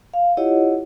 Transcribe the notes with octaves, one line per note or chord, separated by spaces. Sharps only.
F5
E4 F4 G4 C#5 D#5 F#5